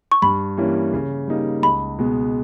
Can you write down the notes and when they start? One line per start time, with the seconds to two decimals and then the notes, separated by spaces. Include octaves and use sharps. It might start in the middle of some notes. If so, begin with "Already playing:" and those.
0.12 C#6
0.22 G2 B5
0.57 E3 G3 A#3 C#4
0.93 C#3
1.28 G3 A#3 D#4
1.62 C#2 B5
1.98 B2 G#3 B3